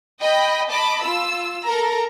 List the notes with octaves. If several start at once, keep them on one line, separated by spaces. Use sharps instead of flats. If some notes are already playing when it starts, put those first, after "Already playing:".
D#5 G5 B5
D#5 A5 B5 D6
F4 E6
A4 A#4 A#5